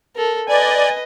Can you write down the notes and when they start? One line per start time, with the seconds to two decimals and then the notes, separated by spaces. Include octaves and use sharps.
0.16 A4 A#4
0.49 B4 D5 D#5 G#5